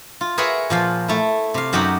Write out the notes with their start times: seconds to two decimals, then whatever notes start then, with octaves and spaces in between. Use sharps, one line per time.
0.21 F4
0.38 G#4 A#4 B4 C#5 E5 F#5
0.70 A#2 F3 F5
1.08 A3 E4
1.54 C3 F5
1.73 F#2 F#3 D#4 F#4 G4 F#5